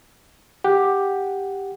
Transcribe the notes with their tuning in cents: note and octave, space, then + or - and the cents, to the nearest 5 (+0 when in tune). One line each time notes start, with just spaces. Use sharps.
G4 +5 F#5 +0